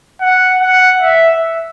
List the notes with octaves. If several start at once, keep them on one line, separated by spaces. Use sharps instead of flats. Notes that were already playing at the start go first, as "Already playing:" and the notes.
F#5
F#5
E5